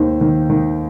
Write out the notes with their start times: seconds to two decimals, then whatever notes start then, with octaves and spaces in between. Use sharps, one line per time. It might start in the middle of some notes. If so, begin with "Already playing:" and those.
Already playing: D#2 D#3 C5
0.21 D#3
0.50 D#3